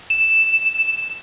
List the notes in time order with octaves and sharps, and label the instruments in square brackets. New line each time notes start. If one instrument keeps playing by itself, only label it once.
[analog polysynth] E7